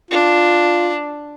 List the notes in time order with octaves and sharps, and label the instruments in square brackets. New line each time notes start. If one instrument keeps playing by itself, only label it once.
[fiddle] D4 [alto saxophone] F4